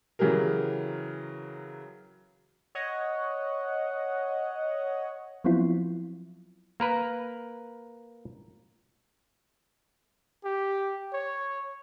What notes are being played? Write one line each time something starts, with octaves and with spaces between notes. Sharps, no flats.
C#3 E3 F#3 G4 G#4 A#4
C#5 D#5 F#5
F3 F#3 B3 C4 E4 F4
A#3 A#4 B4
G4
C#5